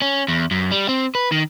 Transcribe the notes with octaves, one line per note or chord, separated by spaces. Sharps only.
C#4
E2
F#2
G3
C4
B4
D#3